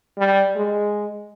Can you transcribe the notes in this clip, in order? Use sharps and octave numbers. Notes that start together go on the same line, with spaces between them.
G3
G#3